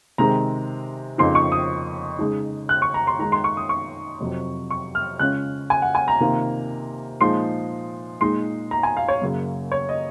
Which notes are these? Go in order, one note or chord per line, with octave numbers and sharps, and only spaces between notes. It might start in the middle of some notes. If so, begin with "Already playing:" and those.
C3 D#3 G#3 C4 A#5
F2 C#3 F3 A#3 D#4 C6
C#6
D#6
C#3 G#3 D#4
F#6
C#6
A#5
C6
D#3 G#3 D#4 A#5
C6
C#6
D#6
C#6
F2 C3 F#3
C#6
F6
C#3 G#3 C#4 F4 F#6
G#5
F#5
G#5
A#5
C3 D#3 A#3 F4
A#2 F3 G#3 D#4 C6
A#2 G#3 D#4 C6
A#5
G#5
F5
C#5
F#2 C#3 F#3 A#3
C#5
D#5